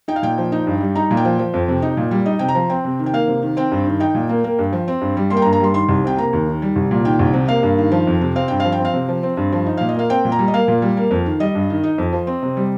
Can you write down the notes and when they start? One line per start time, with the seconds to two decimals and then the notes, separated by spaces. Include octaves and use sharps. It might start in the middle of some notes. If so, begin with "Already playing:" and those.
0.08 D#4 G5
0.16 F5
0.23 A#2 G5
0.38 F3
0.52 D#4
0.67 G2
0.81 G3
0.95 D#4 A#5
1.11 A#2
1.17 G5
1.25 F3
1.39 F3
1.54 F2
1.68 C3
1.82 D#4
1.97 A#2
2.11 G3
2.26 D#4 D#5
2.39 C3 G5
2.48 A#5
2.55 F3
2.70 C4 G5
2.85 C3
2.99 D#3
3.06 G5
3.13 A#3 F5
3.28 C3
3.42 D#3
3.57 C4 G5
3.72 G2
3.86 D#3
4.00 D#4 G5
4.15 A#2
4.29 A#3
4.44 A#3
4.59 G2
4.73 F3
4.88 C4
5.01 G2
5.17 G3
5.30 A#3 C6
5.37 G5
5.42 A#5
5.45 G2
5.53 A#5
5.60 G3 C6
5.74 D#3 C6
5.89 C2
6.04 C3 G5
6.17 A#3 A#5
6.33 D#2
6.48 D#3
6.62 G3
6.76 C2
6.91 A#2
7.05 D#3 G5
7.19 C2
7.33 C3
7.48 A#3 F5
7.63 G2
7.78 D#3
7.92 F3
8.07 F2
8.21 C3
8.36 C4 F5
8.48 G2 G5
8.60 F3 F5
8.72 G5
8.79 C4
8.85 F5
8.94 C3
9.08 F3
9.23 C4
9.37 G2
9.52 F3
9.66 D#4
9.77 A#2 F5
9.89 D#5
9.96 A#3 F5
10.10 C4 G5
10.25 A#2
10.32 A#5
10.39 G3
10.48 D#5
10.54 A#3 F5
10.68 A#2
10.82 G3
10.97 A#3
11.11 F2
11.26 D#3
11.40 G3 D#5
11.55 G2
11.70 D#3
11.83 D#4
11.98 F2
12.13 F3
12.27 C4
12.43 C3
12.57 G3